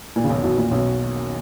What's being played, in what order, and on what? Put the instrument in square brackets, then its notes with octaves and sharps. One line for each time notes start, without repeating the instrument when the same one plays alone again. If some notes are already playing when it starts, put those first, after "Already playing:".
[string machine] E2 D#3 A#3 C#4 F#4 [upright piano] A#2
[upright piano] C#3
B1 B2
B1 B2
A#2
B1 B2